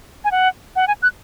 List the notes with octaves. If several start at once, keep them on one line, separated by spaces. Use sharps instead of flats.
G#5
F#5
F#5
G#5
F#6